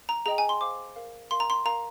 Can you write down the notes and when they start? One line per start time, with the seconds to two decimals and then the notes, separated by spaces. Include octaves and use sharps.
0.09 A#5
0.26 G#4 D#5 G5 A#5
0.38 G#5
0.49 C6
0.61 C5 F5 D6
0.96 A#4 F5
1.31 A#4 F5 C6
1.40 A#5
1.50 C6
1.65 A#4 F5 A#5